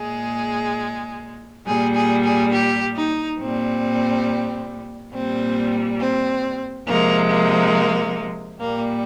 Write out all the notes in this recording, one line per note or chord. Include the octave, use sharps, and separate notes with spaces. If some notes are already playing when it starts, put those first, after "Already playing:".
Already playing: A#2 G#3 G#4
A#2 G3 G#4
G#4
G#4
G4
D#4
A#2 G3 C4
A#2 G3 C4
C4
C3 F3 G#3 A#3
A#3
A#2 G3 A#3